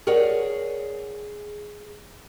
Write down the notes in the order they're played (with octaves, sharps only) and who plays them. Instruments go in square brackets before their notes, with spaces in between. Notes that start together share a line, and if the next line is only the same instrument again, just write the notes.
[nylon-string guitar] G#4 A#4 C#5 D5 F#5